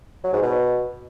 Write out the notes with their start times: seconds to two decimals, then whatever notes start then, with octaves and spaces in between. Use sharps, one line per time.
0.24 F#3
0.33 G#2
0.42 B2